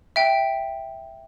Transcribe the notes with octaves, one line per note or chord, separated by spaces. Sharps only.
E5 G5